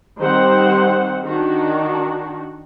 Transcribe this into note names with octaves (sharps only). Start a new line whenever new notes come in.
D#3 G3 C4 G4 C5 F#5
D#3 D4 F#4